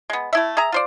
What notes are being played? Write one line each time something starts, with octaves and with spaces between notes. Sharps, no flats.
G#3 B3
A3 E4 E5
G#4 E5 A#5
F4 C5 D5